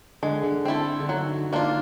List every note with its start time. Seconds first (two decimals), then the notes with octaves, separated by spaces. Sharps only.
0.23 D3 G#3
0.43 D3
0.65 C4 E4 A4
1.00 D3
1.09 D#3 F#3
1.51 D#3 A#3 D4 F4